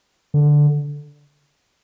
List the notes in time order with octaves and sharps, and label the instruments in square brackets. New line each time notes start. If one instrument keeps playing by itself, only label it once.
[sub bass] D3